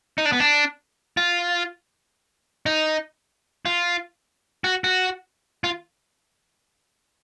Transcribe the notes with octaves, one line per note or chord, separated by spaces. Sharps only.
D#4
D4
B3
D4
F4
D#4
F4
F#4
F#4
F4